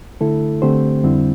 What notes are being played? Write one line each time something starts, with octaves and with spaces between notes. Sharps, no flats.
D3 A3 E4 A4
D3 A3 C4 G4 C5
F2 D3 G3 C4 E4